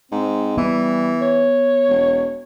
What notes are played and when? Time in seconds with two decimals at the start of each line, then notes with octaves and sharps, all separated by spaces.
0.12 G#2 C4
0.57 E3 G3 B3
1.21 C#5
1.89 E1